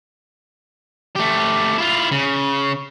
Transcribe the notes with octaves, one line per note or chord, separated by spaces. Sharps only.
A3 G4
E4 F4
C#3